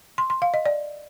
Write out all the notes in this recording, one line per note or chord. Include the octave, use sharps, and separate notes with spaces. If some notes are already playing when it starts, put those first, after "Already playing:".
C6
C6
F5
D#5
D5